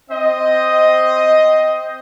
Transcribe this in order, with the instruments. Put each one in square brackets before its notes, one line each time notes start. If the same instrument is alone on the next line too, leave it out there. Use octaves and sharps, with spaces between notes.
[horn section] C4 C5 D#5